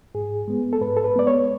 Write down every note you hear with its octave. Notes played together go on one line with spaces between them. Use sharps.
G#2 G#4
G#3 B3
A4
G#2 B4
A4
B4
G#3 B3 D5
C#5